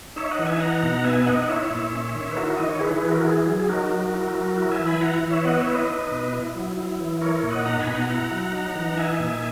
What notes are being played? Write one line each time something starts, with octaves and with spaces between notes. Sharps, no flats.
D#4 C#5 E5
D#5 F#5
E3
E5 G#5
D#4 F#5 A#5
B2 F#5 A#5
B3 E5 G#5
E5
D#4 D#5 F#5
F#5
E4 C#5 E5
A#2
C#4
D#3
B4
E4 F#4 A#4
D#3 D#5
C#5
E4 G#4 B4
G#4 B4
E3
F#4 A#4
E4 G#4
F#3
G#4
D#4 F#4 A#4
F#3
E4
F#3
E4 F#4 A#4
E5 G#5
E3
G#5 B5
E4 F#5 A#5
E3
C#5 E5
B3 D#5 F#5
C#5 E5
E4
B4 D#5
D#4
B2
E4
F#3
E4
E3
E4 A#4 C#5
A#4 C#5
A#2
D#5 F#5
D#4 F#5 A#5
G#5 B5
B2
F#5 A#5
E4 F#5 A#5
F#3
D#4
E3
D#4 E5 G#5
A#2